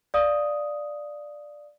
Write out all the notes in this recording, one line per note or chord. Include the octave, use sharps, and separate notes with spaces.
D5 F5 D#6